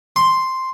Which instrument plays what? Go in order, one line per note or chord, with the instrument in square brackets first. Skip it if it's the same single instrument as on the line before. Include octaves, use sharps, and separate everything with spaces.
[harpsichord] C6